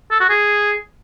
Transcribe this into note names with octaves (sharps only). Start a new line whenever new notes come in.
A4
F#4
G#4